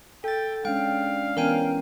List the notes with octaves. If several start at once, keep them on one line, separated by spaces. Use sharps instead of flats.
A4 G5 A6
G#3 C#4 D4 F5 G5
E3 B3 C#4 A#4 G5 G#5